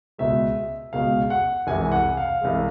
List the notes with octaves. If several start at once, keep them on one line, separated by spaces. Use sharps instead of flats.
C#2 B2 G#3 E5
C#2 B2 G#3 F5
F#5
C2 C3 E3 G#3 G#5
F#5
F5
C2 C3 E3 G#3